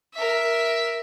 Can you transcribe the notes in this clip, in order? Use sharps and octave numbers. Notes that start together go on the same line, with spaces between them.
A#4 E5